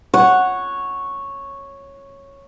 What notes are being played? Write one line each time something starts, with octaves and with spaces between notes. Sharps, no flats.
C#5 F#5